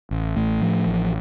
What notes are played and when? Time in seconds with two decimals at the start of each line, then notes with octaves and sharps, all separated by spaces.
0.11 A1
0.36 A2
0.62 F3
0.87 A1